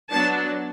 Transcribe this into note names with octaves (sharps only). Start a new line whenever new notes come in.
F#3 B3 D4 A5